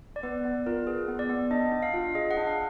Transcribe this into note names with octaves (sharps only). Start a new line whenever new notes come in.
D5
B3 B4
B3 D5
F4 A#4
G#4 B4
B3
D5
B3
D4 D#5
D4
F5
F4
G#4 D#5
F#5
D4
F5